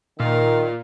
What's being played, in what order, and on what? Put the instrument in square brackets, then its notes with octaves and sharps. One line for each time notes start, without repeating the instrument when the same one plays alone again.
[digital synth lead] A#2 [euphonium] D#3 [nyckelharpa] A#4 F5